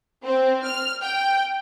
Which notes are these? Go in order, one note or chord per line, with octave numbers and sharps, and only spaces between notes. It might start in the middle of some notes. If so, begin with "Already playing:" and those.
C4
F6
G5